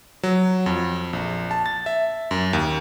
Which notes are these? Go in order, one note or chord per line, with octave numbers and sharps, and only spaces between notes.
F#3
F2
A#1
A5
A6
E5
F#2
D#2